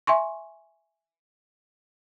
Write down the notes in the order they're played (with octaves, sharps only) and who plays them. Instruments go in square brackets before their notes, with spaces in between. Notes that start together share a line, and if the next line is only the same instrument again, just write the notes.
[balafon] E5 G#5 C6 C#6